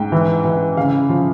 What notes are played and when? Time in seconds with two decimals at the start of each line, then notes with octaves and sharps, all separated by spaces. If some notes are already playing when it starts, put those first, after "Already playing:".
Already playing: G#2 G5
0.12 E3
0.45 E3
0.77 C#3 F5
1.09 F3